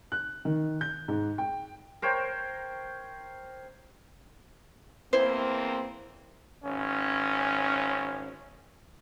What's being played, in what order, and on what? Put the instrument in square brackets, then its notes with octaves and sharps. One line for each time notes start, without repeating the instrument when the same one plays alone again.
[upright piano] F#6
D#3
G6
G#2
G5
[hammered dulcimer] A#4 C5 C#5 G5
[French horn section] E2 A#3 C4 [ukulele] E4 C5
[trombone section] G#1 C#4